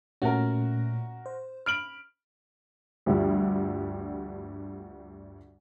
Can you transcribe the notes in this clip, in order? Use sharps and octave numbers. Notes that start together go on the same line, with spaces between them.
A#2 A3 C#4 F#4 A#4
C5
B5 F6 D7 F#7
D2 G2 D3 F3 G3